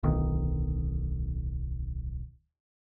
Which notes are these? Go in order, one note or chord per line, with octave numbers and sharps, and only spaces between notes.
D1 B1 D#3